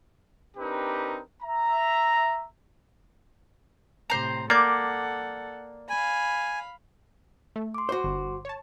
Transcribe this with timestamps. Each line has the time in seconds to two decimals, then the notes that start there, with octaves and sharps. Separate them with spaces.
0.57 C4 D4 D#4 G4 A#4 B4
1.42 E5 A#5
4.10 A2 C3 C5 A#5
4.50 A#3 A4 D5 F#5 G6
5.89 F5 G#5 B5
7.56 A3
7.74 C6 D6
7.89 F#4 C5
8.04 G1
8.45 C#5 A5